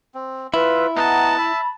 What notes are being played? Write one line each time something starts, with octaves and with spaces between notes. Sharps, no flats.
C4
E4 F4 B4 E5
B3 D#5 F#5 A5 A#5
E5 B5